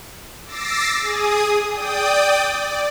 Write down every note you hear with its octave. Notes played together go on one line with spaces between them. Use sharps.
D6 E6 A6 A#6 C7
G#4 D#6
D5 G5 D#6
D5